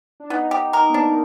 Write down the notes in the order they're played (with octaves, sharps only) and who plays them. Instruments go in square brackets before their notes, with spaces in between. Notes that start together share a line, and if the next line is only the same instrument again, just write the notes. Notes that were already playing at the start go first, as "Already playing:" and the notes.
[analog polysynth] D4
[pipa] B3 [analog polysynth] D#4
[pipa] G4
A#4
[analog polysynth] B3
[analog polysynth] A#3 [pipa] D4